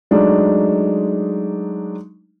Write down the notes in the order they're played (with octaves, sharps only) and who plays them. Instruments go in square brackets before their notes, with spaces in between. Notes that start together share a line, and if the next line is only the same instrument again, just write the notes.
[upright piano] F#3 G#3 A3 D4 D#4